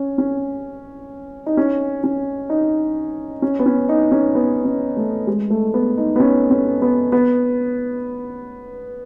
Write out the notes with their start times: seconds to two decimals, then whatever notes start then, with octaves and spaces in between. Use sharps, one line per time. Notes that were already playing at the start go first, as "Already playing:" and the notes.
Already playing: C#4
0.18 C#4
1.46 D#4
1.57 C#4
2.04 C#4
2.50 D#4
3.42 C#4
3.59 B3
3.66 C#4
3.89 D#4
4.12 C#4
4.35 B3
4.65 C#4
4.97 A3
5.27 G#3
5.50 A3
5.74 B3
5.98 D#4
6.16 B3
6.20 C#4
6.51 C#4
6.82 B3
7.12 B3